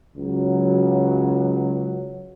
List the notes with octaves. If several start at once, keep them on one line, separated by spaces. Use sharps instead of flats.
C#2 C#3 F#3